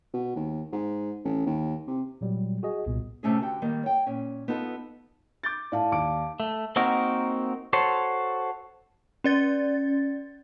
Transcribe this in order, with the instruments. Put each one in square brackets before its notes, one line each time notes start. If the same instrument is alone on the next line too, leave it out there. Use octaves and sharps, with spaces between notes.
[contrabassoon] B2
D#2
G#2
A1
D#2
C3
[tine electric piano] A#2 F#3 G3
F#4 G#4 D#5
C2 A#2 B3
[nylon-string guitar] C3 A3 C#4 G#4
D3 F#4 G4 G5
D#3 G3 A#3
C#5 G5
A#2 C#4
B3 D#4 F4 A4
[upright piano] D6 G6 A6
[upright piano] A2 [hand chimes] D5 F5 A5
[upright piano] D#2 D6 D7
[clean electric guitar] A3
A#3 C4 D#4 F#4 A#4
F#4 A4 C5 C#5
[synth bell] C#4 D5 A6